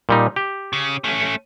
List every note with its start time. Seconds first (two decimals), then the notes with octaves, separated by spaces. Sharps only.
0.09 A#2 G3 D#4
0.36 G4
0.73 C#3
1.04 A3 C#4